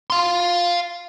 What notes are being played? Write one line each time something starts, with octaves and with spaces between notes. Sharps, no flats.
F5 C6